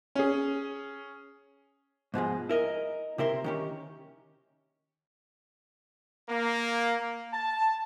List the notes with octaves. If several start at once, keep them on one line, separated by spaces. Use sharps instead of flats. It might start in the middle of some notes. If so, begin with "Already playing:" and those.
C#4 G#4
G#2 B2 F3 G#3
E4 A#4 D#5
C3 E4 A#4 C6
D#3 C#4 G4
A#3
A5